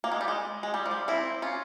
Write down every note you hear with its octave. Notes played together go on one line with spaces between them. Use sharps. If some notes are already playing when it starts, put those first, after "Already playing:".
A#3
G#3
G3
G#3
G#3
G3
F3
G3
C4 E4
C#4 F4